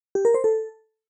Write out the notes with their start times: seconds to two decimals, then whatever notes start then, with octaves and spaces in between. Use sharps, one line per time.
0.15 G4
0.25 A#4
0.34 C5
0.44 A4